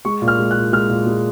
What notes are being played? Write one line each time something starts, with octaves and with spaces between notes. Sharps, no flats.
G#3 C#6
A#2
F6
G#3
F#6
A#2
G#3 F6
A#2
G#3